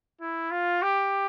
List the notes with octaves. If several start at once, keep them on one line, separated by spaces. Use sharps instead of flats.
E4
F4
G4